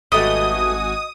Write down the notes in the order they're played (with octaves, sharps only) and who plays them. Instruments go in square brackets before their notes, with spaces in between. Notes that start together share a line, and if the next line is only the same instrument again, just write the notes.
[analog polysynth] G#1 F#4 G#5 [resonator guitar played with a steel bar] G3 A3 B3 [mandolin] D#5 [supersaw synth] D#6